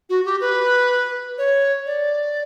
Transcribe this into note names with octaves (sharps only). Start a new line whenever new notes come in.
F#4
G4
B4
C#5
D5